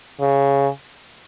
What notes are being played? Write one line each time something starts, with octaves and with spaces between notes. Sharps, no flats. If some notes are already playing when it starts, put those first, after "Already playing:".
C#3